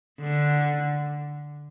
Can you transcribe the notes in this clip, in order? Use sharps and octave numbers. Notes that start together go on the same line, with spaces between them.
D3